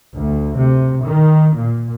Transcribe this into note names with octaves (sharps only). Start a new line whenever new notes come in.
D2
C3
D#3
A#2